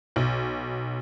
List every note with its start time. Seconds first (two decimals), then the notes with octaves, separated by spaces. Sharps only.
0.16 B1